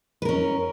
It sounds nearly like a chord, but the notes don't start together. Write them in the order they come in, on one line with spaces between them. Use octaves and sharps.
B4 A#4 C#4